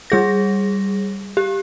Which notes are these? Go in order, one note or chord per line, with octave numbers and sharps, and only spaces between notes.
G3 G#4 A#6
G4